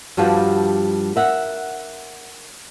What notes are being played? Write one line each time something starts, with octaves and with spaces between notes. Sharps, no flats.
G2 F3 G3 F#4 F5
A#4 E5 F#5